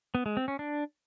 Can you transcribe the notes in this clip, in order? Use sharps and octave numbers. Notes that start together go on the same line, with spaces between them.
B3
G#3
C4
C#4
D4